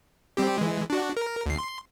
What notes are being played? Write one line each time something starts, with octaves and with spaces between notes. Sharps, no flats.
G3 C4 G4
E3 G#3
D4 F#4
A#4
D2 C7
C6